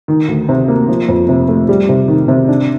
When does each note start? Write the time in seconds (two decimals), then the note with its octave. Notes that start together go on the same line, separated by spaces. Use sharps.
0.08 D#3
0.28 D2
0.49 C3
0.68 A#3
0.89 F3
1.08 F2
1.29 C3
1.48 A3
1.69 G3
1.89 C3
2.08 D#3
2.28 C3
2.48 D4